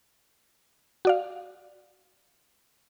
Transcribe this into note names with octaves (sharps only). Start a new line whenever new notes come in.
F#4 D5 F5